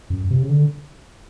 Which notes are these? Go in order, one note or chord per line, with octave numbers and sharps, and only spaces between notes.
F#2
C3
C#3
D3